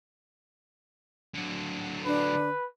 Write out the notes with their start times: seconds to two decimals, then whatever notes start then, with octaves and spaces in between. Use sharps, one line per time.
1.34 D3 F#3
2.06 D4 B4